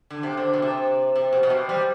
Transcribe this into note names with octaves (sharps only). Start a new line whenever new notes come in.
D3
C3
D3
B2
C3
C3
B2
B2
C3
G3